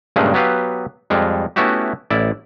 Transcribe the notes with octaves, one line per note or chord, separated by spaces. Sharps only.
G2 A#2 C#3 G#3 A3 C#4
F#3 B3 G4 B4 F5
F2 G3 G#3
A3 B3 C#4 E4 F#4 G4
A1 E4 D5